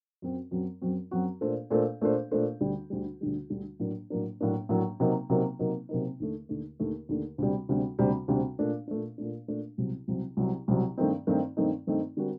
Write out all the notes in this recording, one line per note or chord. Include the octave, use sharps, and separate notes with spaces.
F#2 F#3 C4 F#4
F#2 F#3 C4 F#4
F#2 F#3 C4 F#4
F#2 F#3 C4 F#4
A#2 A3 D4 A4 C5
A#2 A3 D4 A4 C5
A#2 A3 D4 A4 C5
A#2 A3 D4 A4 C5
D2 D3 G3
D2 D3 G3
D2 D3 G3
D2 D3 G3
A2 F#3 A#3 D4
A2 F#3 A#3 D4
A2 F#3 A#3 D4
A2 F#3 A#3 D4
C3 F#3 A#3 D#4
C3 F#3 A#3 D#4
C3 F#3 A#3 D#4
C3 F#3 A#3 D#4
D#2 D3 A3
D#2 D3 A3
D#2 D3 A3
D#2 D3 A3
D2 C3 G3
D2 C3 G3
D2 C3 G3
D2 C3 G3
A#2 A3 D4
A#2 A3 D4
A#2 A3 D4
A#2 A3 D4
C2 C3 F#3
C2 C3 F#3
C2 C3 F#3
C2 C3 F#3
G2 D#3 A3 C4 D#4
G2 D#3 A3 C4 D#4
G2 D#3 A3 C4 D#4
G2 D#3 A3 C4 D#4
D3 G3 C4 F#4 A#4